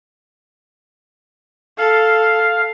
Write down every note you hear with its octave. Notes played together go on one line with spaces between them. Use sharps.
A4 F5